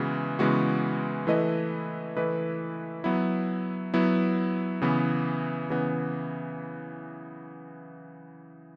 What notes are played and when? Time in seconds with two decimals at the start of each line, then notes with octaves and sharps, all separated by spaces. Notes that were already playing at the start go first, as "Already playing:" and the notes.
Already playing: C#3 E3 G#3 B3 F#4
0.39 C#3 E3 G#3 B3 F#4
1.27 E3 A3 E4 B4 D#5
2.16 E3 A3 E4 B4 D#5
3.04 F#3 B3 E4
3.94 F#3 B3 E4
4.82 C#3 E3 B3
5.70 C#3 E3 B3